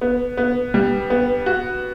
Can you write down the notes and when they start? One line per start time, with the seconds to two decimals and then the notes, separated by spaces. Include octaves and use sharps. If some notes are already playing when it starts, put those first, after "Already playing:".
0.01 B3
0.37 B3
0.74 G3
1.10 B3
1.46 F#4